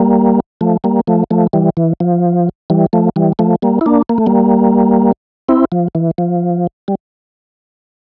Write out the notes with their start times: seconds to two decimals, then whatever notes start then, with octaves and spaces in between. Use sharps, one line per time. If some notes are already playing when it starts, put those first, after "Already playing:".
Already playing: G3 A#3
0.61 F3 A3
0.84 G3 A#3
1.07 F3 A3
1.31 F3 A3
1.53 E3 G3
1.77 E3
2.00 F3
2.70 E3 G3
2.93 F3 A3
3.16 E3 G3
3.39 F3 A3
3.62 G3 A#3
3.81 E4
3.86 A#3 D4
4.09 A#3
4.18 A3
4.26 G3 A#3
5.49 C4 E4
5.72 F3
5.95 E3
6.18 F3
6.88 G3